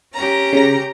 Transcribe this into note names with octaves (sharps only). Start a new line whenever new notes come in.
C#4 G4 A#5
C#3 A#6